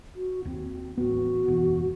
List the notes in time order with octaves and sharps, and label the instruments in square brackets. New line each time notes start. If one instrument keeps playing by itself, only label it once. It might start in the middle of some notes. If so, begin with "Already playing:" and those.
[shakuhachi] F#4
[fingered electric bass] D#2 [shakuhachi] C4
[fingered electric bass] A1 B3 [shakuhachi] F#4
[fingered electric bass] F#1 E2 B2